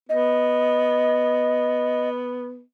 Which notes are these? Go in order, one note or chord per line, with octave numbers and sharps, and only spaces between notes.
B3 D#5